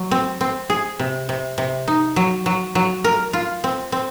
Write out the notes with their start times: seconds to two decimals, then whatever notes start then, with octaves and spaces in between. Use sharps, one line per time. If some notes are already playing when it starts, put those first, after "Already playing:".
Already playing: F#3
0.11 C4
0.41 C4
0.70 G#4
0.99 C3
1.29 C3
1.58 C3
1.88 D#4
2.16 F#3
2.46 F#3
2.75 F#3
3.04 A#4
3.33 F4
3.64 C4
3.92 C4